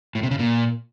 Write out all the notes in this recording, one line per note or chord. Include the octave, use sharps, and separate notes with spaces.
A2
C3
C#3
A#2